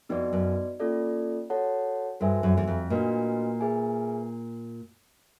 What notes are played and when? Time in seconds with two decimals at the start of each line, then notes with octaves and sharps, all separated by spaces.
0.09 F2 B3 D#4 F#4 B4 D5
0.33 F#2
0.80 A#3 C#4 F4 A4 D5
1.50 F#4 A4 C#5 F#5 A5
2.20 G2 F#4 A4 C5 E5 G#5
2.43 F#2
2.57 E2
2.67 F2
2.90 A#2 A3 D4 F#4 B4 D#5
3.61 G#4 B4 E5 G#5